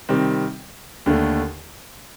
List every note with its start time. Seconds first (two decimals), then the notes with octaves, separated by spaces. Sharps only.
0.09 C3 D#3 G3 C4
1.06 D#2 D3 A3